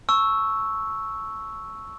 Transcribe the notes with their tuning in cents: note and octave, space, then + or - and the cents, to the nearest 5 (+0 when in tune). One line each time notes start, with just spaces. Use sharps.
A5 +0 C#6 +0 E6 +0